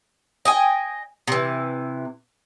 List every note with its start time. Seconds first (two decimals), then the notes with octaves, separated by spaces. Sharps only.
0.45 D#5 G5 G#5
1.28 C3 E3